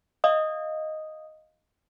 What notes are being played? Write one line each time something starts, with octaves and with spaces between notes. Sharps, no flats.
D#5 F5 D#6